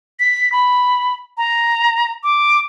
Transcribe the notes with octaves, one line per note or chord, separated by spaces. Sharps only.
B6
B5
A#5
D6